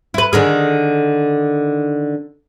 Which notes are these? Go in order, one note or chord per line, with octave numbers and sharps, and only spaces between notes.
E4 B4
D3 D#3 G#4